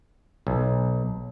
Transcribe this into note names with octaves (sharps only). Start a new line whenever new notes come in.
B1